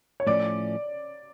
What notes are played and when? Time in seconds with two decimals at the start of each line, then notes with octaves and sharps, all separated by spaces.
0.20 C#5
0.27 A2 F3 A3 C#4 D5